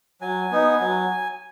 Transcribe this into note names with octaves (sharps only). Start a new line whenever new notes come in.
F#3 G#5
B3 D#4
F#3